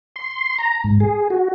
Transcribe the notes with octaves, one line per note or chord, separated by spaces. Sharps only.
C6
A#5
G#2
G#4
F#4